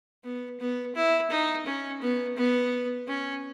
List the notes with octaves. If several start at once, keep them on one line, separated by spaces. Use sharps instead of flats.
B3
B3
E4
D#4
C#4
B3
B3
C#4